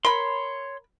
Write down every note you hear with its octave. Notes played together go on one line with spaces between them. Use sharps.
A#4 C#5 B5 C6